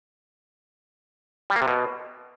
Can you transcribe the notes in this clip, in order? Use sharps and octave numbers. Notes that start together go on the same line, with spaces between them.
G3
A#3
C3
B2